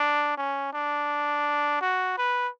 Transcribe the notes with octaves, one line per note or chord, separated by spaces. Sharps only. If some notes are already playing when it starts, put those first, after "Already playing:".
Already playing: D4
C#4
D4
F#4
B4